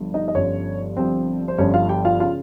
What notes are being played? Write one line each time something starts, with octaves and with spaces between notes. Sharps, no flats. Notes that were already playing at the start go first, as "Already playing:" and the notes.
Already playing: G1 G2 F3
D#4 D#5
D#5
G1 G2 F3 C#4 C#5
G1 G2 F3 C4 C5
C5
G1 G2 F3 C#4 C#5
F4 F5
G4 G5
F4 F5
C#3 F4 F5